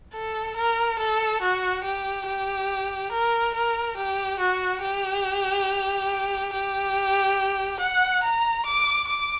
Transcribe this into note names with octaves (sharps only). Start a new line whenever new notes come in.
A4
A#4
A4
F#4
G4
G4
A#4
A#4
G4
F#4
G4
G4
F#5
A#5
D6
D6